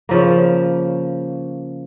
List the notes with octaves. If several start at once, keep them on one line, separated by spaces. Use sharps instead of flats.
C#3 F3 A#3